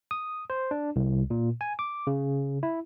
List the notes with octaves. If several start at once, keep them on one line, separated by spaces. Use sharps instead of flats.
D#6
C5
D4
C2
A#2
G#5
D6
C#3
E4